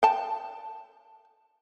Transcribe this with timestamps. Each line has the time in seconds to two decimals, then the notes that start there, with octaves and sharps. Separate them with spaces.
0.03 G5 A5